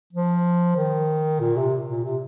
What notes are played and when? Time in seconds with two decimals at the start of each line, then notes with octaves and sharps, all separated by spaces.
0.13 F3
0.77 D#3
1.40 A#2
1.58 C3
1.89 A#2
2.04 C3